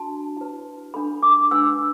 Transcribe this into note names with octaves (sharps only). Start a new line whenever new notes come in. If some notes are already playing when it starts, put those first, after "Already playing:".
Already playing: D4 F#4 A5
E4 B4
D4 A4 B5
D6
D4 B4 E6